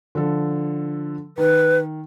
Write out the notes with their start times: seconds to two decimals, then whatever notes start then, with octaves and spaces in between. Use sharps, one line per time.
0.15 D3 F3 A4
1.38 D#3 B4